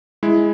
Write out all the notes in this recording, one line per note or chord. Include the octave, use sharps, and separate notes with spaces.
G#3 E4